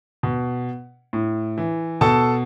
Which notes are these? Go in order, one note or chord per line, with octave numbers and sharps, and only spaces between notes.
B2
A2
E3
B2 A4 A5